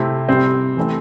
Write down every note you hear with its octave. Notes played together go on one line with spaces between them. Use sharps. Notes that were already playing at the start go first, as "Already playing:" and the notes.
Already playing: C3 A3 C4 E4
C3 G3 C4
E3 A3 C4